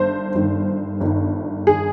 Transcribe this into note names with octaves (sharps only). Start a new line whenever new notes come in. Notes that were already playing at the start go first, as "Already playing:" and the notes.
Already playing: G1 G2 D#3 C5
G1 G2 D#3
G1 G2 D#3
D#3 G#4